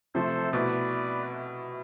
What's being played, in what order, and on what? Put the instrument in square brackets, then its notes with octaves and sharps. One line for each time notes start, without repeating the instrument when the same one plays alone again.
[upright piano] C3 F3 A3 [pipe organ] A4 C5
[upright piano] B2 A3 E4 [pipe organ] B4 D5